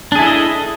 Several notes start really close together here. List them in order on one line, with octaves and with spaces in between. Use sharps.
D4 G#4 E4 A4 D#5